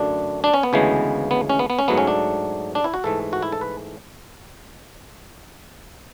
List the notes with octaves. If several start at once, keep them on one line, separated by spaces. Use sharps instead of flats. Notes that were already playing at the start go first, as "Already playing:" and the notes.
Already playing: F#2 D3 A3 D4
D4
C#4
B3
D2 C#3 E3 G#3
B3
C#4
B3
B3
C#4
G#2 F#3 A3 B3
C#4
D4
D4
E4
F#4
G#2 E3 A3 A4
F#4
E4
A4
B4